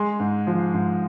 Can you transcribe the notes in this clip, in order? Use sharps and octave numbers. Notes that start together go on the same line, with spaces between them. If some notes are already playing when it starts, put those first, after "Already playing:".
Already playing: G#3 C6
G#2
F3
G#2